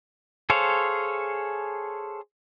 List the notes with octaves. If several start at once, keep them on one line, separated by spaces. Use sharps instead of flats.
G#4 A4 C5 C#5 F5